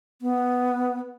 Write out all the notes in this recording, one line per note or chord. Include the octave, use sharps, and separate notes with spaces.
B3